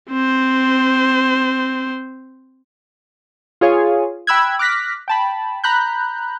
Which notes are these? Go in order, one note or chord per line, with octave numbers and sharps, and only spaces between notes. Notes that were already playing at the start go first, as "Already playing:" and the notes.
C4 C5
F4 G#4 C#5 F5 G#5
G5 B5 E6 F#6 G#6
D6 F6 F#6 A#6 B6
G5 A5 B5
A#5 B5 F#6 G6